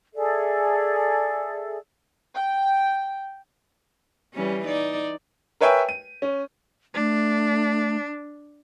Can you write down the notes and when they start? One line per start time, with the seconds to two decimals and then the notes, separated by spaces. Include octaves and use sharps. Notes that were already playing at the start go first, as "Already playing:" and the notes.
0.15 G#4 A4 D5 E5
2.35 G5
4.34 E3 G3 C#4
4.65 D#4 D5
5.61 A#4 B4 C#5 E5 G5 G#5
5.89 D#7
6.22 C#4
6.94 A3 D4